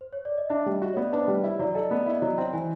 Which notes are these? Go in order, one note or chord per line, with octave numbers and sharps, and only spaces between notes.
C5
C#5
D5
D#5
D4 E5
G3
D#5
F#4
C#5
B3 D5
D4 B4
C5
G3
E4
F#3 D5
D5
A4 D#5
B3 D5
E4
D#5
F#3
C4
E3 G#5